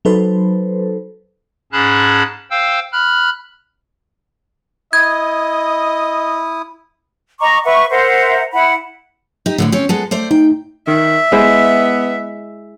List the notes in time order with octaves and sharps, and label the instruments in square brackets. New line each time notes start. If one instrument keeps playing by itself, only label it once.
[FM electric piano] F#3 D#4 A4 B4 C5
[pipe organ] G#2 C#4 G#4 A5 B5 F#6
C5 F5 G5 E6
B5 F6 F#6
[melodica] E4 D#6 [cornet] D#5 [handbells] G#6
[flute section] D#5 A#5 C#6 D6
B4 E5 F#5 C#6
A#4 C5 E5 F#5
E4 F#5 B5
[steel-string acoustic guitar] D#4 G4
D2 A2 D3
C4 C#4 C#5
G#3 B3 A4
A3 C5 D5
[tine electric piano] D#4 [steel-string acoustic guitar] G5
[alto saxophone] D#3 [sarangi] E5
[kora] G#3 E4 C5 [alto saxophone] B3